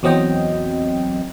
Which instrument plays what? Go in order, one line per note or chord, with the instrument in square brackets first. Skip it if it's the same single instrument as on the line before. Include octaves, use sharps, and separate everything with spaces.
[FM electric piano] E2 F#3 C4 D#5 G5